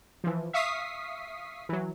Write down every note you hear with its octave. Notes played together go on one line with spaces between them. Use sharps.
E3 F3
E5 F5 C#6 D#6 B6 C7
E3 F#3